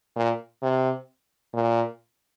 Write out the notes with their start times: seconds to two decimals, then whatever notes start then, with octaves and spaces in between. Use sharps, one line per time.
0.16 A#2
0.63 C3
1.54 A#2